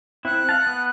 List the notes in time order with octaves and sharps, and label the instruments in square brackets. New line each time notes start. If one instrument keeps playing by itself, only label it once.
[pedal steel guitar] C4 E4 [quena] F#6
[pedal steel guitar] F5 A5
B3